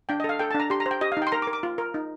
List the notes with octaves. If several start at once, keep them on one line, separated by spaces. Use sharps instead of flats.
D4 G5
D#5
A4
F5
A4 G5
A5
D4 A#5
G4 C6
A#5
C5
G5
G4 D#5
F5
D#4
G5
C6
A#4 A#5
D6
A#4
D6
F4
A#4
D#4